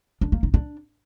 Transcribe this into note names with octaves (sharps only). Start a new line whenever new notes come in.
D4
A#3
D#4
D4